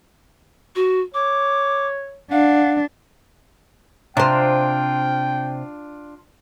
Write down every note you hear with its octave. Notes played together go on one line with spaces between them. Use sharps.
F#4
C#5 D6
D4 F5 F#5
C3 D4 F4 C5 G5